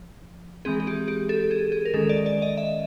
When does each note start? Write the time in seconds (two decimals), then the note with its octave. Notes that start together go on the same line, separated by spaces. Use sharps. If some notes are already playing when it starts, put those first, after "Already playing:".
Already playing: F3
0.65 E3 G#3 C4 G#4
0.80 G#4
0.87 G4
1.08 G4
1.29 A4
1.51 G#4
1.72 G#4
1.85 A#4
1.94 D#3 G#3 C#4 A4
2.09 D5
2.26 D5
2.42 D#5
2.57 E5